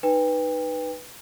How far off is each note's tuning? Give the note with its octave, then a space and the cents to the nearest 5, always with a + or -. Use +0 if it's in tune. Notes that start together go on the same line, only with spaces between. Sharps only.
D#4 -15 B4 -5 G5 +35